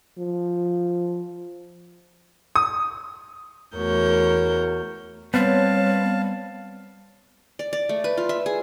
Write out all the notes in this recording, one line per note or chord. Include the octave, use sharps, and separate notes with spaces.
F3
D#6
E2 A3 F#4 A#4 C#5 G6
G3 B3 C4 C#5 F5 A5
D5
D5
A3
B4
F4
E5
G#4